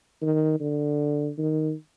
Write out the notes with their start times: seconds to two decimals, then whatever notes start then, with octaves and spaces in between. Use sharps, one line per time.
0.22 D#3
0.60 D3
1.38 D#3